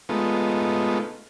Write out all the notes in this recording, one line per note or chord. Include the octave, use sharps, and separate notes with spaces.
G#3 A3 B3 D#4 F4